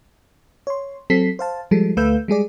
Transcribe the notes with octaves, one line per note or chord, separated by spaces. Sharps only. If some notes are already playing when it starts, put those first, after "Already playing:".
C#5 C6
F#3 C4 A4 B6 C7
C5 F5 A5
F3 G3 G#3 A4
D2 A3 B4 F5 E6 G6
G3 G#3 G#4 D5